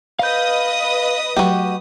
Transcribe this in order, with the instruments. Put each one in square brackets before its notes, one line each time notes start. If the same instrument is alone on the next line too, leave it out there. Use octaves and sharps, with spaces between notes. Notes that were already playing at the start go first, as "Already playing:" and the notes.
[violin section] B4 D#5 D#6 [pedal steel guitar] F5 G6
[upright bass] F#3 A3 [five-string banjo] F#4 G4